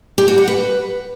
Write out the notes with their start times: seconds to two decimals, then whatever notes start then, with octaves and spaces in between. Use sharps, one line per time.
0.18 G4
0.28 F#4
0.38 F#5
0.48 B4